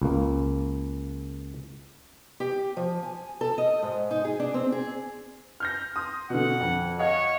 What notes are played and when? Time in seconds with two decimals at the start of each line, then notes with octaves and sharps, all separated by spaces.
0.02 C#2 A#3
2.40 G4
2.77 F3
3.03 G#5
3.41 A4
3.58 D#5
3.83 G#2
4.11 D#4
4.25 G#4
4.40 D4
4.54 C4
4.72 G#4
5.60 F6 G6 A#6
5.96 C6 D#6
6.30 B2 D3 F#5
6.60 F2
6.99 C#5 D#5 F5 F#5